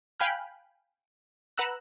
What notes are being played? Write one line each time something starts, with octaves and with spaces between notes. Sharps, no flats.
F5 G5 G#5 B5 F6 F#6
B4 F#5 A#5 E6 F#6